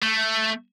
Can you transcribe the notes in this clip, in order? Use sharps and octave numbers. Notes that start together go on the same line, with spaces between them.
A3